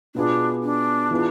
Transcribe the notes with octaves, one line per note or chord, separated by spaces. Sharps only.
B2 B3 D4 F4 G#4
D4
E3 B3 F4 G#4